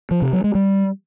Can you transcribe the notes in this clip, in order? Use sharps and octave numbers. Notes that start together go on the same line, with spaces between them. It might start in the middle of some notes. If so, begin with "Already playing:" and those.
F3
C3
F#3
G#3
G3